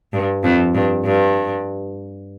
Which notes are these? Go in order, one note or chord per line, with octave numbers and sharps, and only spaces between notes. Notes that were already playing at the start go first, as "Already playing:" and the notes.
G2
F2
G2
G2